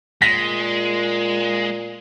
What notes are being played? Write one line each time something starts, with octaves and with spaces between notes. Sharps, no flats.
A#2 G#3 A#6 B6